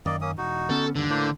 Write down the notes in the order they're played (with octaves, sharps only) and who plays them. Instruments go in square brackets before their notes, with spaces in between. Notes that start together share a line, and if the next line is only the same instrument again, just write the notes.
[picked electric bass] F#2 D#3 [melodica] A#3 D5 D#5
[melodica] A#3 C#4 D#6
[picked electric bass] E1 [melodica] D#4 F#4
[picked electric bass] D3 B3 C#4 [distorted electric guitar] A4
[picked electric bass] G1 D#2 [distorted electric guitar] D3
[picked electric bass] A2 [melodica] A#3 D4 C5